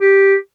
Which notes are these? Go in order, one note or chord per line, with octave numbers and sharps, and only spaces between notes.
G4